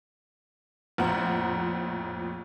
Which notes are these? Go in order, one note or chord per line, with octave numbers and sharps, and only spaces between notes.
A#1 F2 A2 C5 F#5 A#5